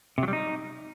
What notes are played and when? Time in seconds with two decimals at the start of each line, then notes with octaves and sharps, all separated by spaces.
0.18 C3
0.23 F#3
0.28 G3
0.33 D#4